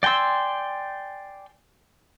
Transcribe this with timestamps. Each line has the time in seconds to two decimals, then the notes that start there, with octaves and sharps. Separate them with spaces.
0.03 D5 G5 G#5 C6 E6